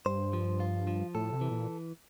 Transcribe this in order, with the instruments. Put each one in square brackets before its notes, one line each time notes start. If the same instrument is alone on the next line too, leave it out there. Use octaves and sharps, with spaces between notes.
[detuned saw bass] G2 [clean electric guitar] C5
[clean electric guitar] F3
F4
F3
[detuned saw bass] A2 [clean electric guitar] A4
[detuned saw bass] C3
[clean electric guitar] E3
[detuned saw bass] A#2